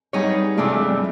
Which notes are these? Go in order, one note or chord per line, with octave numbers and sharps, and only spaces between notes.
G3 B3 D#4 G#4 C#5
C3 E3 G#3 A3 D4 F4
G#3
G3